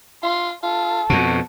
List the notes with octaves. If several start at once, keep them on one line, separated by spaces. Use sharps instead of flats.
F4 C6
F4 A4
F2 B2 F#4